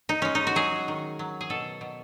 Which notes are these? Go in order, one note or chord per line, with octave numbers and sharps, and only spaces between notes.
D#4
G#3 C#4
D#4
F#4
F#3 G#4
D#3
F#3
G#4
B2 A4
B2